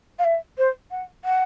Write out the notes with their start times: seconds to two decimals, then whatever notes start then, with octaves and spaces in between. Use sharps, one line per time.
0.19 F5
0.24 E5
0.58 C5
0.91 F#5
1.25 F#5